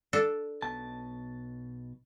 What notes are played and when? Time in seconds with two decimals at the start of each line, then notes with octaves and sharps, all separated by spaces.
0.13 D4 A4
0.62 B1 B2 A5